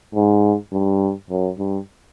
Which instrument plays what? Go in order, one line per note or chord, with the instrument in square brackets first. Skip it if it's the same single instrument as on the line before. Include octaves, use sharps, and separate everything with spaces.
[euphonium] G#2
G2
F#2
G2